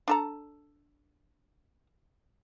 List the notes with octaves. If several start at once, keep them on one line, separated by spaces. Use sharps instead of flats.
D4 A4 A#5